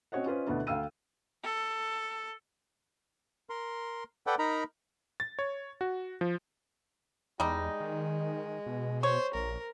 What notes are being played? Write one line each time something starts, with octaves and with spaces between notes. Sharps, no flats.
C4 C#4 F#4 C#5 D#5 F#5
C#4 F4 B4 C5 D#5
D2 B2 B3 D4 E4
D2 F5 G5 E6 D#7
A4
A#4 C6
A4 B4 D5 F#5 G5
D#4 A#4 A#5 B5
A6
C#5
F#4
F3
E2 G3 G#3 D#4
D#3
B2
C5 C#5
A#1 A#4